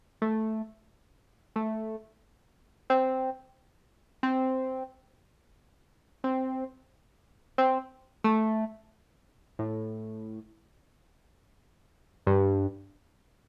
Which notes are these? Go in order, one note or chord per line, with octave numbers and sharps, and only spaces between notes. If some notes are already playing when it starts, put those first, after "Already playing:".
A3
A3
C4
C4
C4
C4
A3
A2
G2